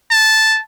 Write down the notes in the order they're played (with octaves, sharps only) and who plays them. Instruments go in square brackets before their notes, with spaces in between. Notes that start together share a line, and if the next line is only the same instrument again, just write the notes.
[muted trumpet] A5